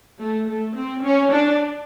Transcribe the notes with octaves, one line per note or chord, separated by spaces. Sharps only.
A3
A3
C4
C#4
D4